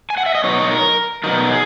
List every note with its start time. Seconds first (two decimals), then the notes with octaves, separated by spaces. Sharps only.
0.10 G#5
0.18 F#5
0.26 E5
0.35 D#5
0.44 B2 F#3 B3 D#4 C#5
0.71 A#4
1.24 B2 F#3 B3 D#4 A#4
1.50 G#4